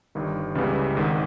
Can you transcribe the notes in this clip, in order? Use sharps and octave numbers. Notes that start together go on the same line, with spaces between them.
G1 G2 D#3
C#2 C#3 E3 G3 B3
G#1 G#2 D#3